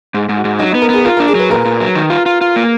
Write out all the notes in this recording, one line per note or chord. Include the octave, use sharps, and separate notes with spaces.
G#2 G#4
G#2
F#4
G#2
F#3 D#4
B3 D#4
A#4
B3 G#4
G#4
F4 A#4
D4 A#4
G#4
F#3 B4
A#2 A#4
A#2
F#3
D#3
F4
F4
F4
A#3